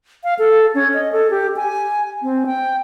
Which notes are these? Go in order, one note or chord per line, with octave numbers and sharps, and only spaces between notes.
F5
A4
C#4
D#5
A4
G4
G#5
C4
G5